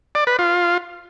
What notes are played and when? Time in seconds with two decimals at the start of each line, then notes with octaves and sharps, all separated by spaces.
0.15 D5
0.27 B4
0.39 F4